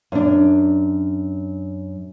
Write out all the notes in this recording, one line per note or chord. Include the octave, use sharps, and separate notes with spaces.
F#2 D4